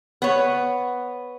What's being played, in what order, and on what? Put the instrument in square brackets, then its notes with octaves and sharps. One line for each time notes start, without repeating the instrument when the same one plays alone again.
[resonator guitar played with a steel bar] B3 C#5